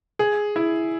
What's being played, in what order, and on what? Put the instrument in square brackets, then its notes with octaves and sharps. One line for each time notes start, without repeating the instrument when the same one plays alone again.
[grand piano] G#4
E4